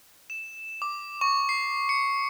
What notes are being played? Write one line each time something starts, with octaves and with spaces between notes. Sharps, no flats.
E7
D6
C#6
C7
C#7